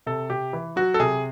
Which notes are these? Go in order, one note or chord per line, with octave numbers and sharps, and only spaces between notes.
C3 A4
C3 G4
E3
F#3 F#4
A4
C3 G#4